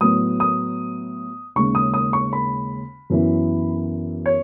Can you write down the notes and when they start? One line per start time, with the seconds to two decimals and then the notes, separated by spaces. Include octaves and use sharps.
0.01 A2 F#3 B3 D#6
0.40 D#6
1.56 D#2 C#3 G#3 C#6
1.75 D#6
1.94 D#6
2.13 C#6
2.33 B5
3.10 F#2 E3 B3 E4
4.26 C#5